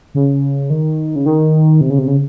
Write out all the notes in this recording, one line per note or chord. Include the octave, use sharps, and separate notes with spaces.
C#3
D#3
C#3
D#3
C3
C#3
C3
C#3